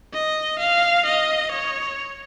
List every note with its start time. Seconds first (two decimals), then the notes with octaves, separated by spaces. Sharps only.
0.13 D#5
0.59 F5
1.06 D#5
1.51 C#5